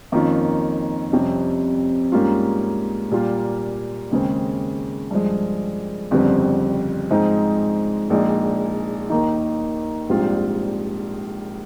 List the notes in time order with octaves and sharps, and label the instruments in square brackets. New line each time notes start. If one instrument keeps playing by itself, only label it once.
[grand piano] F2 D#3 A#3 C#4 F4
F2 C3 G3 C#4
G#2 G3 A#3 C#4 F4
A#2 G3 A#3 F4
D#2 C#3 G#3 C4
G2 F3 G#3
G1 F2 C#3 G3 C4
G#2 F3 G#3 C4 D#4
A#1 A#2 G#3 D#4
D#2 D#3 A#3 D#4
A#1 G#2 G3 C4 F4